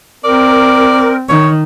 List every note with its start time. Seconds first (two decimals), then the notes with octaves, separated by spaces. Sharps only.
0.24 C4 A#4 D5
1.29 D#3 C#5